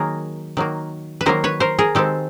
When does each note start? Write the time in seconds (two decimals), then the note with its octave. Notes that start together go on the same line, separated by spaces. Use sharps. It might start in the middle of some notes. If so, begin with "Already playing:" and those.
Already playing: D#3 F#3 A#3 G#4 A#4
0.57 D#3 F#3 A#3
1.21 B4
1.26 D#3 F#3 A#3 A#4 C5
1.44 B4 C#5
1.60 A#4 C5
1.79 G#4 A#4
1.95 D#3 G#3 C4 G4 A4